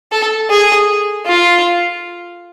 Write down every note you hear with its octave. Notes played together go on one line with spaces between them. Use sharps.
A4
G#4
F4